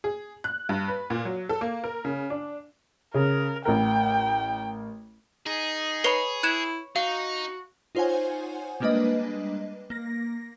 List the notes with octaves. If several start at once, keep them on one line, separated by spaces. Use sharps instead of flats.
G#4
F#6
G2
B4
A#2
F#3
A4
A#3
A#4
C#3
D4
C#3 A#4
A1 A#4 G5
D#4 G#4
B4 C#5 B5 C7 G7
E4 F#6 G#6 E7
D#4 F#4 F5
D#4 F4 C5 C#5 F#5 G#5
G3 G#3 A#3 D4 B4 D#5
A#3 A#6